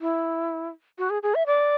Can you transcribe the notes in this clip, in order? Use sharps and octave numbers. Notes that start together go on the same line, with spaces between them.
E4
F#4
G#4
G#4
E5
D5